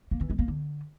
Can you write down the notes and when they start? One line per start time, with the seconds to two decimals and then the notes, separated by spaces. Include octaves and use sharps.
0.11 A#3
0.21 E3
0.30 G#3
0.39 A#3
0.48 D3